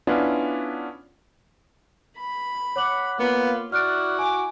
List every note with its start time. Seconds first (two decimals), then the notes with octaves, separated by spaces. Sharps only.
0.07 B3 C#4 D4 E4 F4
2.17 B5
2.76 C#5 F#5 D6 F#7
3.19 A#3 B3 F4
3.72 E4 F#4 D5 F6 F#6 D7
4.19 G#5 D6